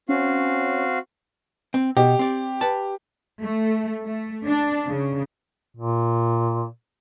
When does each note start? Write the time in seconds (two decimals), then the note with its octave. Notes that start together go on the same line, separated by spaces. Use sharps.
0.09 C4 C#4 F#4 F5
1.74 C4
1.97 B2 G4
2.19 C4 D5
2.61 B4 A5
3.42 A3
4.05 A3
4.47 D4
4.87 C#3
5.77 A#2